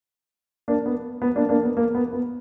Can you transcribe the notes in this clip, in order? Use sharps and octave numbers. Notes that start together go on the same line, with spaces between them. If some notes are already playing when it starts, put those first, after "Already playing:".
A#3 D4
B3
B3
A#3 D4
A#3 D4
B3
A#3
B3
B3